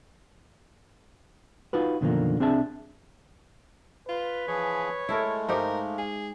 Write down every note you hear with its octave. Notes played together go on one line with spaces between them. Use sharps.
D#4 F4 F#4 B4
F#2 B2 D3 D#3 F3 A#3
C2 C4 D4 G#4 E5 A5
F4 B4
E3 F3 G#4 C#5
G#3 A3 E4 A4 A#4
G#2 D#4 G4 A#4 F5
G#4